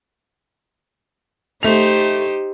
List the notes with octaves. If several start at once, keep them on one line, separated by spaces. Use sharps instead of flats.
A3 D#4 G4 C5 F7